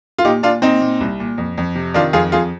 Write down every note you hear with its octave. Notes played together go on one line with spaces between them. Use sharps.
F4
A#2 D#4 G4
A#2 D4 F4
A#2 C4 D#4
A#2
C2
A#2
F2
F2
C3
D#3 D4 F4
F2 F4 G#4
F2 F4 G#4